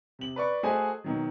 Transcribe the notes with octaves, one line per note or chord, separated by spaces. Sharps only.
C3 F#7
B4 D5 C#6
A3 F#4 G#4 C5 D#5 G#5
B2 D#3 F#3